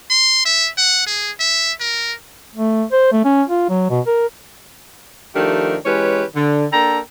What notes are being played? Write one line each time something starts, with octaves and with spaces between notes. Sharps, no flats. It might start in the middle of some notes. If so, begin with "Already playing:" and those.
C6
E5
F#5
G#4
E5
A#4
A3
C5
A3
C#4
F4
F#3
B2
A#4
D#3 F3 A3 D4 G4 A#4
E3 G#3 C#4 G4 B4 C#5
D3
A#3 D4 A4 G5 A#5